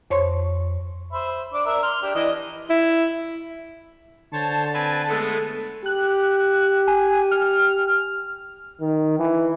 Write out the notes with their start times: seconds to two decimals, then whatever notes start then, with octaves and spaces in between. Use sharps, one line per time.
0.10 F2 C5 C#5 C6 C#6
1.13 C5 E5 B5
1.54 D4 D6
1.66 D4 A#4 E5
1.83 C6 F6
2.02 D4 G4
2.15 E3 D4 D#5
2.70 E4
4.33 D3 C5 C#5 A5
4.74 C4 B4 G#5
5.08 G#3 A3 B3 A4
5.86 G4 F#6
6.87 G#5
7.31 F6
8.80 D#3
9.19 E3